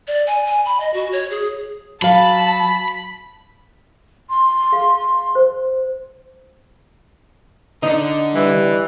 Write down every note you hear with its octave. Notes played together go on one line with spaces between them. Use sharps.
D5
G#5
G#5
B5
D#5
F#4
C#5
G#4
F#3 F5 A5 B5
C6
G#4 F5
C5
D3 D4 D#4
E3 G3